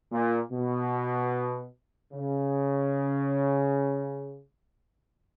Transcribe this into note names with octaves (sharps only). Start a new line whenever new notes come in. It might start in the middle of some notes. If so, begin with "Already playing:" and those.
A#2
B2
C#3